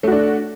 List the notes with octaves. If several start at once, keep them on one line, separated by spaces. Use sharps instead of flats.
A3 D4 F#4